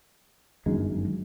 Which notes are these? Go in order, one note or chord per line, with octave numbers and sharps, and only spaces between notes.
G1 F#2 D#3 G#3